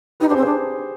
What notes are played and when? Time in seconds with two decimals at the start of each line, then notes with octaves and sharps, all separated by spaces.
0.20 D#4 G4 B4
0.29 D4 G#4 C5
0.36 C4
0.42 D4 G#4 C5